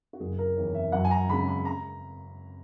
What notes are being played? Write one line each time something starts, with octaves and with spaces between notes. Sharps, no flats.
F#4
F#1 G#4
A#4
E2 D#3 C#5
E5
F#2 F#5
G#5
A#5
C#3 G#3 C#4 B5
B5
A#5